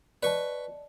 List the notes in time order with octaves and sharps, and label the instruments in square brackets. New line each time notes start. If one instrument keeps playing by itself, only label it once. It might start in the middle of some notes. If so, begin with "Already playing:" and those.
[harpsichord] B4 C#6 [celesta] D5 D#5 A5